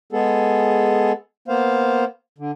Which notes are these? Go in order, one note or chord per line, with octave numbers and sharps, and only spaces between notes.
G#3 B3 G#4 A4
A#3 B3 C5 F5
D3